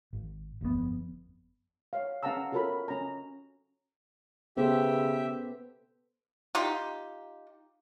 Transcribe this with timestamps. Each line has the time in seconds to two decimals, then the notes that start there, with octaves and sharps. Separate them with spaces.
0.13 G#1
0.61 G1 F2 G#2 B3
1.93 C#5 F5
2.23 C#4 F5 F#5 A5 A#5 E6
2.52 F4 F#4 A4 A#4 C#5 B5
2.88 C#4 A#5
4.57 C#3 B3 G4 A4 C5 E5
6.55 D#4 F4 G4